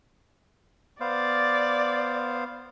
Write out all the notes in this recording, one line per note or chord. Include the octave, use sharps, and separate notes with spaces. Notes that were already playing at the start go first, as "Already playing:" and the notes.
B3 C5 D5 F5